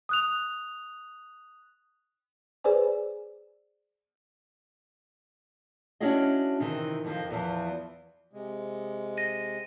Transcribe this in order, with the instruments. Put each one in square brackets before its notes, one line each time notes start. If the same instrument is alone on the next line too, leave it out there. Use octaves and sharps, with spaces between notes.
[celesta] D#6 F#6 F7
[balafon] G#4 B4 C5 D5 G#5
[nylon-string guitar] C#4 D4 E4 F#4 G#4 D#5
C3 D#3 E3 D#4
F2 D#3 F3
E2 E3 F3
[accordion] C3 G#3
[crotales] A#6 D#7